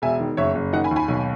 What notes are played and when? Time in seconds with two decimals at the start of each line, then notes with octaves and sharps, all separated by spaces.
0.02 E1 E5 G#5
0.20 D#3
0.37 F#1 C#5 E5
0.55 F#1
0.73 D#3 D#5 F#5
0.84 G#5 B5
0.91 D#2
0.96 G#5 B5
1.08 B1